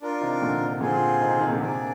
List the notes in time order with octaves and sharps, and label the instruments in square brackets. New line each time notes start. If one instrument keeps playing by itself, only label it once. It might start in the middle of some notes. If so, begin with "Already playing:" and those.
[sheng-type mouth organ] D4 F4 A#4
[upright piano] C3 D#3
A#2 D3
C3
[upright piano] A#2 D3 [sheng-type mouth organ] C4 F4 G#4
[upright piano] C3 D#3
C3 D#3
A#2 D3
[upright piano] C3 [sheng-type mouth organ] A#3 D4 G#4 D5